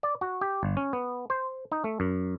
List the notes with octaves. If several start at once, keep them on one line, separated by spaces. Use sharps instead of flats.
D5
F#4
G4
G1
C#4
B3
C5
D#4
A3
F#2